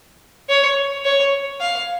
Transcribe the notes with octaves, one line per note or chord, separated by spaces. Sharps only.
C#5
C#5
F5